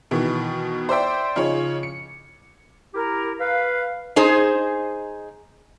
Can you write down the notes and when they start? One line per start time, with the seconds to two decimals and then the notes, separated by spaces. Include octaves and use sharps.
0.11 B2 D#3 E3
0.89 C5 D5 E5 G5
1.36 C#3 F3 D#4 C#5
1.83 C#7
2.95 E4 G4 A#4
3.40 B4 F5
4.16 D#4 G#4 C5